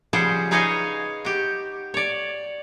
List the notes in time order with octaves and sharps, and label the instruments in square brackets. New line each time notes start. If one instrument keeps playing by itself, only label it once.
[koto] C#3 F3 G3 G#4 C5 F#5
D#4 G#4 B4 C#5 D#5 F5
F#4 G4
C#5 D5